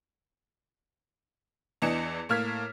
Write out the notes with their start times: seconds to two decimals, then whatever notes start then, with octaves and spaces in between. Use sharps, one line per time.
1.82 E2 E3 D4 D#5 C#7 E7
2.29 A2 A#3 F6 G#6 B6